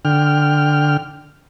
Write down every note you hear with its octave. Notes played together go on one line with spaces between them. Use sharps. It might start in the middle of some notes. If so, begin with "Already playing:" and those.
D3 G5 F6